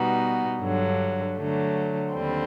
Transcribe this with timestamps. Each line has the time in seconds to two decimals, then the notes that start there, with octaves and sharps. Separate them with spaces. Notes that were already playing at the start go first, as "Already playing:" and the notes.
Already playing: B2 G3 B3 D#4 F#4
0.61 G2 D3 F#3
1.37 D3 F#3 A3
2.14 D#2 D3 G3 C4